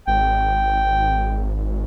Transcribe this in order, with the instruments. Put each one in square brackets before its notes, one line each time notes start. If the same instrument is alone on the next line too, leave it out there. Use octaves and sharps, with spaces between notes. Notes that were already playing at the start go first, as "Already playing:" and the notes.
[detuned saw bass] G#1 [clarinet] G5